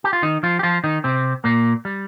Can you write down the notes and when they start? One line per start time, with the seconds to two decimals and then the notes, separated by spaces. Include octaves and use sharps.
0.04 G4
0.13 F4
0.23 D#3 D#4
0.43 F3 F4
0.59 G4
0.63 F3 F4
0.84 D#3 D#4
1.04 C3 C4
1.44 A#2 A#3
1.85 G3